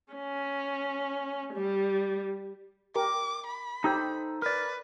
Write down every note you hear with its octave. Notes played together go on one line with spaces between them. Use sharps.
C#4
G3
G4 A#4 D6
B5
D#4 G4 A4 C5
A#4 B4 D5